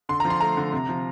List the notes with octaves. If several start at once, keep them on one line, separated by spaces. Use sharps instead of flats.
D3 C6
A#5
F3
C6
A3 A#5
D3
C3
F3